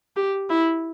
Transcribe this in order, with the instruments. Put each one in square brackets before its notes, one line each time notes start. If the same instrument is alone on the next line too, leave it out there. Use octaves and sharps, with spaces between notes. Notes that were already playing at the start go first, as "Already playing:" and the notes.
[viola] G4
E4